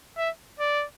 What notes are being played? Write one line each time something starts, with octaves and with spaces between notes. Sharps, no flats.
E5
D5